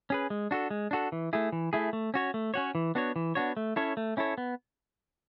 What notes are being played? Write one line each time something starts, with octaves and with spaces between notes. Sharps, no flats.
C#4 G#4 B4
G#3
D4 F#4 A4
G#3
D4 F#4 A4
E3
A3 E4 G#4
E3
A3 E4 G#4
A3
C#4 F#4 C#5
A3
C#4 F#4 C#5
E3
B3 D4 F#4 C#5
E3
B3 D4 F#4 C#5
A3
C#4 E4 A4 C#5
A3
C#4 E4 A4 C#5
B3